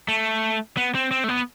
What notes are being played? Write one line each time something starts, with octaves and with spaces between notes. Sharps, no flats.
A3
B3
C4
C4
A3
B3